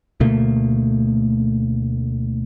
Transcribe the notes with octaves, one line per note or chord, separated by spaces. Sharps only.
D2 B2 A3 A#3